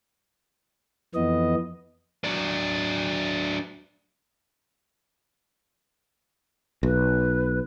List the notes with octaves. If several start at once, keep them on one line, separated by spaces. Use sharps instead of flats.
F2 E3 B3 D#5
F#3 D4
B1 B4